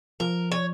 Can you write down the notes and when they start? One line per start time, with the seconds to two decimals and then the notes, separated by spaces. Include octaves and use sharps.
0.20 F3 A#4
0.52 C#5